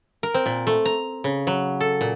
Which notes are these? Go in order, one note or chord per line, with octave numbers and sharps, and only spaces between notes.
A#4
C4
A#2
A3
A#5
C#3
F#3
A4
A#2